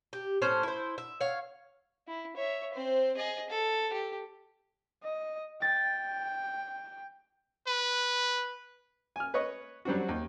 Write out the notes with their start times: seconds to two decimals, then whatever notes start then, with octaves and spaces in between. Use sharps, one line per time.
0.13 G4
0.42 A2 C#4 C5
0.63 E4 C5
0.98 E5
1.20 C#5 F5
2.08 E4
2.36 C#5 E5
2.73 C4 C5
3.17 G#4 D#5
3.50 A4
3.93 G4
5.03 D#5
5.62 G5 A6
7.67 B4
9.16 G#5 F6
9.34 B4 C#5 D#5 C#6
9.85 F#3 G3 C4 D4 F#4
10.09 D#2